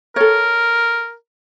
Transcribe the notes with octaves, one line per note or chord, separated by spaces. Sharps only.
A4 A#4 C#5